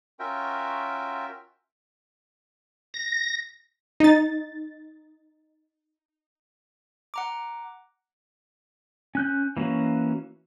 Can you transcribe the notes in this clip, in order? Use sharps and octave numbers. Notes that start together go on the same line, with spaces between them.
C#4 F4 F#4 A#4 E5 G5
A#6
D#4 A6
F#5 A#5 D6
C#4 F#6 G6
E3 A#3 C#4 F#4